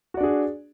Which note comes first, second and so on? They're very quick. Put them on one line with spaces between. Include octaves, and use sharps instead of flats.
F#4 D5 D4 G#4